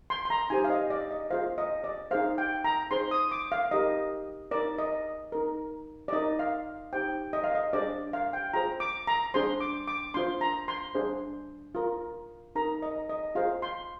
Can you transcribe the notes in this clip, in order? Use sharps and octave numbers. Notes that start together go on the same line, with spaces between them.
C6
C6
A#5
D#4 G4 C5 G#5
F5
D#5
D5
D#5
F4 G#4 C5 F5
D#5
D5
D#4 G#4 C5 F5
G5
A#5
D#4 G#4 C5 C6
D#6
D6
F5
D#4 G4 A#4 D#5
D#4 A#4 D5
D#5
D#4 A#4
D5
D#4 A#4 D#5
F5
D#4 G4 C5 G5
D#5
F5
D#5
D4 G#4 C5 D5
F5
G5
F4 G#4 C5 A#5
D6
A#5
D4 G#4 C5 C6
D6
D6
D4 F4 C5 C6
A#5
C6
D4 G#4 C5
F4 A#4
D#4 A#4 A#5
D#5
D#5
F4 G#4 C5 F5
C6